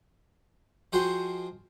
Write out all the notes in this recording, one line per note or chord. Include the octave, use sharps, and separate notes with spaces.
F3 F#4 G#4 C5 D#5 G5